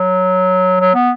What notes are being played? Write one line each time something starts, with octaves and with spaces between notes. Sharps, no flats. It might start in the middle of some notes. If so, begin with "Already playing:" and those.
Already playing: F#3
F#3
B3